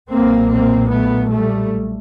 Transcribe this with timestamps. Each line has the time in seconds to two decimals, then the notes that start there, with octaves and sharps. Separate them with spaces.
0.12 B1 A#2 A#3 C4
0.51 A#3 C4
0.91 A3 B3
1.32 G3 A3